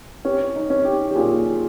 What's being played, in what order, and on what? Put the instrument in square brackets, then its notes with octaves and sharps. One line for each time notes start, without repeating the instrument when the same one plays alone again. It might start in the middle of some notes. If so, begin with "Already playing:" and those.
[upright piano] C#4 [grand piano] G4
[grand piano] D#4
[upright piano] C#4
[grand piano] G4
G4
[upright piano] A#2 [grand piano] G#4